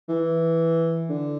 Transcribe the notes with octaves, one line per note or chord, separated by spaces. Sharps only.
E3
D3